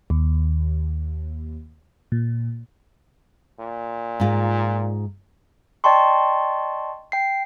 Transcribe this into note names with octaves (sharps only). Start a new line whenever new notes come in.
D#2
A#2
A#2
G#2 F4
D5 D#5 G5 A5 C6 C#6
G5 C7